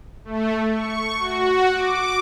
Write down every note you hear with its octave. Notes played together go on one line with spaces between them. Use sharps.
A3
C#6
F#4
D6